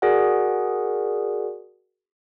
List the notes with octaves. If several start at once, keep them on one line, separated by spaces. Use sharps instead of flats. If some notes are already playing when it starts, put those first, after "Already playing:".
F#4 G#4 A#4 D5 F#5